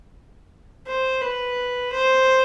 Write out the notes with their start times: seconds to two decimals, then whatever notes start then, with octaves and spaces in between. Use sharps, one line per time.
0.87 C5
1.22 B4
1.93 C5